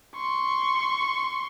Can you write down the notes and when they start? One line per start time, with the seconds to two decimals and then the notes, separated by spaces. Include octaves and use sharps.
0.16 C6 C#6